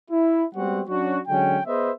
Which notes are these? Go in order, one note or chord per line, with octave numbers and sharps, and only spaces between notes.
E4
G3 G#3 B3 C4 F#4 F#5
F#3 C#4 D4 F#4
D3 F#3 G#3 C#4 G5
B3 G#4 B4 C5 D#5 E5